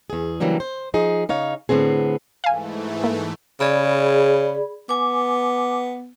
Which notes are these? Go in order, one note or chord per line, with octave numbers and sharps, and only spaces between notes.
E2 G#4
C#3 E3 F#3 G3 A#3 D4
C5
F3 D#4 G#4
C#3 D#4 C#5 F5
A2 D3 B3 C4 G#4
G#2 E3 A3 F5 G#5
A#3
C#3 G#4 D5 B5
B3 G#5 D6